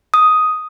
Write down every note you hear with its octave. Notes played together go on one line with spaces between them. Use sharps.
D#6